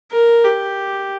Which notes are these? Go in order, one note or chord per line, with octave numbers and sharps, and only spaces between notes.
A#4
G4